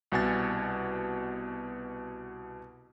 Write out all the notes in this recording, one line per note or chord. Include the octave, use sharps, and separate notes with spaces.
C2 B2 F#5 G#5 A6